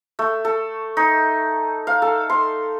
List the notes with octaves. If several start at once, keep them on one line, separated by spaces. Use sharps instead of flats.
A3
A4
D#4
F5
A4
C6